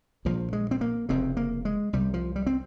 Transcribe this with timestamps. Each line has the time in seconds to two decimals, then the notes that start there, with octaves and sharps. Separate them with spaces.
0.25 A#1 A#2 F3
0.53 G#3
0.71 C4
0.81 A#3
1.09 F1 F2 C#3 C4
1.37 A#3
1.65 G#3
1.93 C2 C3 G3
2.14 F3
2.36 G3
2.47 C4